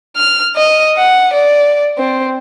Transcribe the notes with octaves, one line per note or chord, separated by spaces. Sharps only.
F6
D#5
F#5
D5
C4